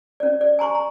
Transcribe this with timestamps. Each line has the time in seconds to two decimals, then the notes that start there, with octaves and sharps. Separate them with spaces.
0.20 C#4 D5
0.41 D5
0.59 G#5 A#5 C6 C#6
0.75 A#5